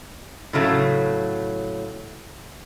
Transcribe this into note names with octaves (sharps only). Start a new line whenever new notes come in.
A2 C#3 F#3 A3